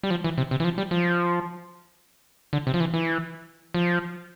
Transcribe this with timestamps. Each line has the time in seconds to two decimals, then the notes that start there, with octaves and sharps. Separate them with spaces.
0.03 G3
0.11 F3
0.24 E3
0.38 C3
0.51 C3
0.60 E3
0.64 F3
0.78 G3
0.91 F3
2.53 D3
2.67 C3
2.74 F3
2.80 E3
2.94 E3
3.74 F3